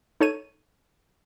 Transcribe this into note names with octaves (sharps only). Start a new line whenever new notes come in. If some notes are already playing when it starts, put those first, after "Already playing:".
D#4 A4 C#5 G#6 D#7